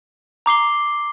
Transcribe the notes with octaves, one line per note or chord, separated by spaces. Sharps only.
A#5 D6 C7 G7